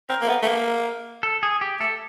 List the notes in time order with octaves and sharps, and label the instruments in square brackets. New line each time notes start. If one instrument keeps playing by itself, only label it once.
[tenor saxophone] C4 [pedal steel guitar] A#4
[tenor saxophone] A#3
B3
A3
A#3
[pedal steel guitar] A4
G#4
G4
[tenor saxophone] A3 [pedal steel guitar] A4